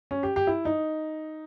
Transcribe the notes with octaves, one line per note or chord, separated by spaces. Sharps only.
C#4
G4
G4
E4
D#4